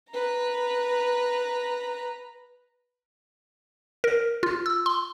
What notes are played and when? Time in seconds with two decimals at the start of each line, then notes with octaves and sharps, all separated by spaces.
0.11 B4 A#5
4.04 A#4
4.43 F4
4.66 E6
4.86 C6